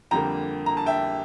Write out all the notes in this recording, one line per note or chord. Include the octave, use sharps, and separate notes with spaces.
F2 D3 G3 A#3 G5 A#5
A#5
A5
E5 G5